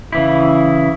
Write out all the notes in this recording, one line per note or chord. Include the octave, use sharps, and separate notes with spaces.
C#3 E3 E4